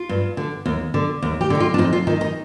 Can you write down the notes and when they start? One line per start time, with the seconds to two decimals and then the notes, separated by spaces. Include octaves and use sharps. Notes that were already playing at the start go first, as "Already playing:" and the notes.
Already playing: F4
0.09 G2
0.37 D3
0.66 D#2
0.94 D3
1.22 D#2
1.41 G4
1.50 D3 D#4
1.60 F4
1.74 D4
1.78 F2 D#4
1.93 F4
2.07 D#3 D#4
2.21 D#4